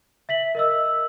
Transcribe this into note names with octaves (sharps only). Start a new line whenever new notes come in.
E5 B6 F#7
A#4 D#5 E6